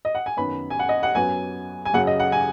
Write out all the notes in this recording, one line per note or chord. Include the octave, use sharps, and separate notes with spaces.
D#5
F#5
G#5
F#2 D#3 B3 B5
G#5
F#5
D#5
F#5
F#2 F#3 B3 G#5
G#5
F#2 C#3 F#3 F#5
D#5
F#5
G#5